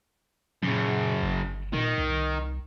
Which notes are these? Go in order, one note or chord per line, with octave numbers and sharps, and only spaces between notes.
F#2 A#2 C#3
G1
A#2 D#3
C2